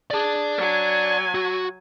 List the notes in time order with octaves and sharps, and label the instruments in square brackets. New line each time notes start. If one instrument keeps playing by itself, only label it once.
[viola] G#4 [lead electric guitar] D5 A5
[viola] F#3 G#5
[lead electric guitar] F#4